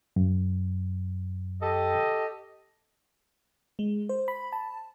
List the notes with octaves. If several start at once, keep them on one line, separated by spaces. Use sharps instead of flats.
F#2
G4 A4 D#5
G#3
C5
B5
A5